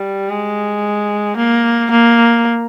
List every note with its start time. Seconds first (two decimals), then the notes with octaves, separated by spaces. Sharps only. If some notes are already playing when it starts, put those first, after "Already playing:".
Already playing: G3
0.29 G#3
1.37 A#3
1.91 A#3